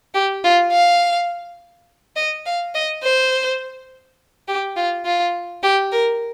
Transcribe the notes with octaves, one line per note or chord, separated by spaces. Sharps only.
G4
F4
F5
D#5
F5
D#5
C5
G4
F4
F4
G4
A#4